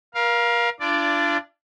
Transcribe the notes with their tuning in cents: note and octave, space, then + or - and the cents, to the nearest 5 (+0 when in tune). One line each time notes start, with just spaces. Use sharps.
A#4 +35 F5 +0
D4 -5 F4 -40 D5 +0